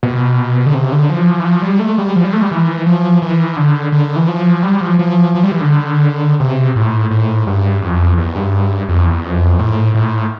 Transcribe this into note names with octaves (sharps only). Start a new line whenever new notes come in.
B2
D3
C3
D3
F3
E3
F3
G3
A3
G3
F3
G3
A3
G3
E3
F3
E3
D3
D3
E3
F3
G3
F3
F3
F3
G3
E3
D3
C3
A2
A2
G2
F2
E2
G2
F2
E2
F2
A2
A2